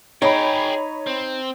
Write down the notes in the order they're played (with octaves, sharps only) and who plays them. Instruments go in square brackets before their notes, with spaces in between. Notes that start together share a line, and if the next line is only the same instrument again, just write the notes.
[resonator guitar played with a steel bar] D#4 [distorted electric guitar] G#4 G5 [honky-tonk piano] C#5 B5
[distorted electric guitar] C4